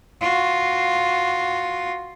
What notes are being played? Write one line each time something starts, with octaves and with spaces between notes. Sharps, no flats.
F4 F#4